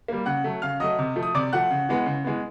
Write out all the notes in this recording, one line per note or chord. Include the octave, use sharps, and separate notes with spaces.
G3 A#3
C#3 F#5 F#6
F#3 A3
C#3 F5 F6
F#3 A3 D#5 D#6
C3
F3 A3
D#6
C3 D5 D6
F3 A3 F#5 F#6
C#3
E3 G#3 B3
C#3
E3 G#3 B3